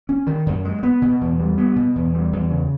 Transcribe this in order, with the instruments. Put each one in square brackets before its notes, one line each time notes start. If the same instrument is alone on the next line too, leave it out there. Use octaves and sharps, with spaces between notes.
[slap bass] C#4
D#3
F#2
G#3
B3
B2
E2
G3
B3
B2
E2
G3
E2
C#3